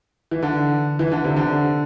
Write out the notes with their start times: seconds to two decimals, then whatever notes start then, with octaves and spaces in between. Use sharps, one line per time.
0.31 E3
0.43 D3
0.99 E3
1.12 D3
1.24 C3
1.37 D3